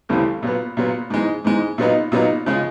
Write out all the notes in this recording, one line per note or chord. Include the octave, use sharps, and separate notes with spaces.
D2 C#3 E3 G3 C4
A#2 F#3 B3
A#2 F#3 B3
G#2 E3 G#3
G#2 E3 G#3
A#2 F#3 B3 D#4
A#2 F#3 B3 D#4
C#3 F3 G#3